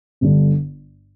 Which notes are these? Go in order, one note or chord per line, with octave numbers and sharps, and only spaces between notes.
G1 G2 D3